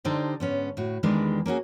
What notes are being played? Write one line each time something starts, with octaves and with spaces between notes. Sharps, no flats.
D3 D4 D#4 G4 C5
G#2 B3 C#4
A2 F#4
E2 D#3 E3 G3 G#3 D4
A#3 C#4 F#4 G#4